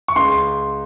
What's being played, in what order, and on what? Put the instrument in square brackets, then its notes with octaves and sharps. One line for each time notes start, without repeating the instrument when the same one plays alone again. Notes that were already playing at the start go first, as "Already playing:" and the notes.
[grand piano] C#6
C#2 C6